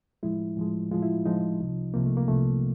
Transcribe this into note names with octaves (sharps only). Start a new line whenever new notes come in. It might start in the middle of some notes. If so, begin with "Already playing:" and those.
A2 F3 G#3 E4
A2 F3 G#3
A2 F3 G#3 F4
E4
A2 F3 G#3 D#4
C2 C3 F3
C2 C3 F3 A#3
A3
A#3
C2 C3 F3 A3